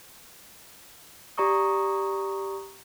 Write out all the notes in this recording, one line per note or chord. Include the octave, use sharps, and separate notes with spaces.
G4 D5 A#5 C#6 D#6